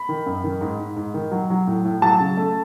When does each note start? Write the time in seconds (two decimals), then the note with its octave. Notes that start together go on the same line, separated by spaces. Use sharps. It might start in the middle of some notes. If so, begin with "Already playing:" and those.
Already playing: B5
0.09 D#3
0.26 F#2
0.44 D#3
0.61 G#2
0.79 G#2
0.96 G#2
1.14 D#3
1.31 F#3
1.50 F#3
1.67 A2
1.85 A2
2.02 F#3 A5
2.20 C#3
2.37 A3